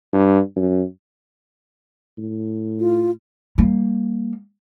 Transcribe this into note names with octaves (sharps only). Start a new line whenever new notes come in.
G2
F#2
A2
F4
G3 A#3